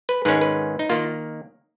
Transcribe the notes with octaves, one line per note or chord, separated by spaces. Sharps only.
B4
G#2 D#3 G#3 C#4 B4
B4
D#4
D#3 A#3 F4